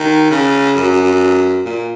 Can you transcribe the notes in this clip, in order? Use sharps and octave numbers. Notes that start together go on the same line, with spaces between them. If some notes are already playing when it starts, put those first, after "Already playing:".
Already playing: D#3
C#3
F#2
A#2